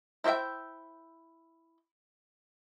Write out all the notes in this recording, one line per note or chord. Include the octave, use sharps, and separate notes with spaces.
E4 C5 D#5 E5 G5